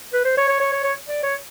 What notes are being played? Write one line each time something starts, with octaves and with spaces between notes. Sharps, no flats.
B4
C5
C#5
C#5
C#5
C#5
C#5
D5
C#5